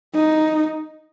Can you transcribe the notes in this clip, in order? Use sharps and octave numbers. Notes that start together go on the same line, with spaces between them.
D#4